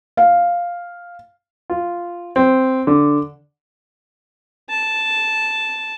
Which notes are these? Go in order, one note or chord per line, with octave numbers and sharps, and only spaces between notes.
F5
F4
C4
D3
A5